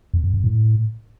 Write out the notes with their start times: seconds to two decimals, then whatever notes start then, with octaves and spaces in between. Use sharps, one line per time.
0.14 F2
0.24 F#2
0.34 F#2
0.44 A2